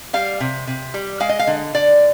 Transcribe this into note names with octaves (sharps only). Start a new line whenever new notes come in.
G3 F5
C3
C3
G3
G#3 F5
D#5
F5
D3
D3 D5